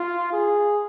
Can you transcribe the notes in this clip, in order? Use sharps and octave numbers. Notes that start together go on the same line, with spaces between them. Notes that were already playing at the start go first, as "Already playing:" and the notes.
Already playing: F4
G#4